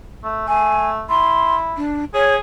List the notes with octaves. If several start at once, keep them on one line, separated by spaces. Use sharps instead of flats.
A3
A3 G#5
E4 C6
D4
G#4 C#5